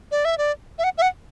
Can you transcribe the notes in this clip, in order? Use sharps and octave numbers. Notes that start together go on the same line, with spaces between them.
D5
E5
D5
E5
F#5
E5
F#5